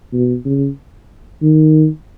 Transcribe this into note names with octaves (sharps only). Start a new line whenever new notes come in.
B2
C#3
D#3